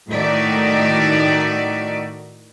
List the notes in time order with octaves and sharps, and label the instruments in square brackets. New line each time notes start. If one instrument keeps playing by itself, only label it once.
[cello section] A2 D#3 D#4 F#4 D5 E5